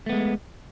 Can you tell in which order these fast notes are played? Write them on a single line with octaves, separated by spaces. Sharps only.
A3 B3 G#3